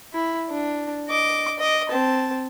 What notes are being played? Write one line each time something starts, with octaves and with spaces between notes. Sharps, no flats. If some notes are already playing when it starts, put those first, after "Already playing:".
E4
D4
D#5 D6
D#5 D6
C4 A5